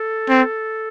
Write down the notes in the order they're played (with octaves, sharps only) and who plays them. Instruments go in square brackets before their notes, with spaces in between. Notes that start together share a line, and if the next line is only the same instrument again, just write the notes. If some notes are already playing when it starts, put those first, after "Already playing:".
Already playing: [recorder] A4
[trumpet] C4